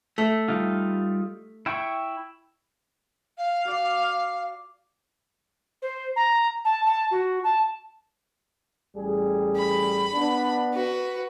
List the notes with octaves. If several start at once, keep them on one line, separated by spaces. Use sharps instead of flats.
A3
G3 D#4 F4
E4 G5 C#6
F5
F#4 D5 D6
C5
A#5
A5
A5
F#4
A5
A1 G3 G#4
B5
B3 D4
F#4 B4